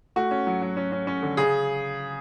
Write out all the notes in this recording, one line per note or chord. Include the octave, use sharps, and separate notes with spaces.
A3 F#4
C#4
F#3
F#3
C#4
C#4
C#4
D3
C#3 G#4